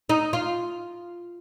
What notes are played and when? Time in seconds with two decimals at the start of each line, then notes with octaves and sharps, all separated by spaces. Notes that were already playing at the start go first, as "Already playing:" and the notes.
0.09 D#4
0.33 F4